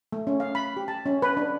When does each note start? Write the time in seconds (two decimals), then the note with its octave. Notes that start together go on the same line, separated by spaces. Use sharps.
0.12 A3
0.27 C#4
0.40 F5
0.55 B5
0.77 G4
0.88 A5
1.06 C#4
1.22 B4
1.37 D4